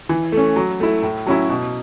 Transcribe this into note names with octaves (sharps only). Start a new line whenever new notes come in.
E3
A3
C#4
F#3
A3 E4
A2
F#3 C#4 E4
B2